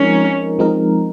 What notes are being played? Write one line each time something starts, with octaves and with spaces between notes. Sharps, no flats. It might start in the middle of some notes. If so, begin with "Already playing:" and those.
Already playing: F3 G#3 C4 C#4 D#4 A#4
F3 G#3 C4 D#4 A#4